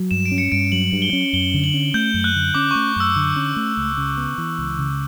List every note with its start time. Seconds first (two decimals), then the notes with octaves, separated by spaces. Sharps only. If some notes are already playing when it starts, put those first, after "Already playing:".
Already playing: F#3
0.11 G2 E7
0.26 D7
0.31 C#4
0.38 C#7
0.52 G2 D7
0.72 F#3 F#7
0.93 G2
1.02 G7
1.13 C#4
1.33 F#2 G7
1.54 D3
1.64 F#7
1.74 C#4
1.94 A3 G6
2.14 F#2
2.24 F#6
2.35 D3
2.54 C#4 D6
2.71 A3 C#6
2.96 F#2 E6
3.16 D3
3.36 C#4
3.56 A3
3.77 C#2
3.97 C#3
4.17 B3
4.38 E3
4.59 C#2
4.79 C#3